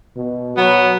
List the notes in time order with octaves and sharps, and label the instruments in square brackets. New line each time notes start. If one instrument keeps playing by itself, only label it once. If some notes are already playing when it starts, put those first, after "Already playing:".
[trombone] B2
[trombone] F#3 [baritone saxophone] B3